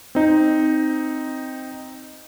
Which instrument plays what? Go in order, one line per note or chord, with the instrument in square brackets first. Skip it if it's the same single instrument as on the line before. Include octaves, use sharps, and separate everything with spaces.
[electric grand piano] C4 D#4